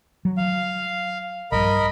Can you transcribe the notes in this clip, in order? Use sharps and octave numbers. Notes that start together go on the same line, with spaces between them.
F#3
F5
A#1 G2 A#4 D#5 B5